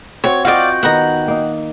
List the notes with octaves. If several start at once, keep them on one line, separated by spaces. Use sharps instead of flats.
C4 F#4 C#5
F4 F#4 D5 D#5 F5 G5
D#3 B3 F#5 A#5
A#3 D#4